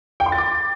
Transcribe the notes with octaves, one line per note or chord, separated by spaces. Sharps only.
G5
C6
A6
D6